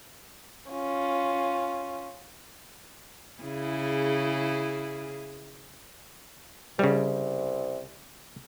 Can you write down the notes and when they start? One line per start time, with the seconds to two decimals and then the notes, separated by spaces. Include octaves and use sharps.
0.71 C#4 F4
3.42 C#3 E4 G#4
6.79 C2 C#3 G3